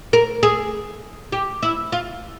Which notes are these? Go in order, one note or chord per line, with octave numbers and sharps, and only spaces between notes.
A#4
G#4
G4
E4
F4